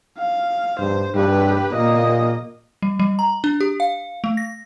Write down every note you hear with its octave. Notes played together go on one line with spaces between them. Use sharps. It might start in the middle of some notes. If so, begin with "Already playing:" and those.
F5
G2 C5
G2 G4 B4
A#2 A#3 D#5
G3
G3
A#5
D4
G4
F5
A3
A#6